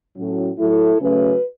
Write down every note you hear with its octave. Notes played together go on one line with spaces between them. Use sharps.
A2 F#3 C#4
A2 F#3 A3 E4 A4
C#3 F#3 A3 C#4 F#4 B4